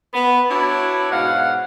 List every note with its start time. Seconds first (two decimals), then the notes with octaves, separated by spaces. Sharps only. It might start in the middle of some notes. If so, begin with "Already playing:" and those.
0.13 B3
0.49 D4 E4 F#4 C#5
1.10 G#2 B2 F5 F#5